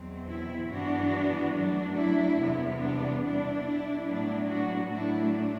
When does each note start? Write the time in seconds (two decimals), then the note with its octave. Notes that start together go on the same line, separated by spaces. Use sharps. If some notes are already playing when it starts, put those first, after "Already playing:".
Already playing: E2 B2 F#3 C4
0.27 E4
0.69 G2 E3 B3 D4 F#4
1.54 F#2 F#3 A3 D4
1.96 E4
2.38 E2 C3 G3 B3
2.81 D4
3.22 B2 G3 D4 E4
3.65 E4
4.06 A2 F#3 B3 D4 E4
4.48 D4 F#4
4.90 A2 F#3 A3 D4 E4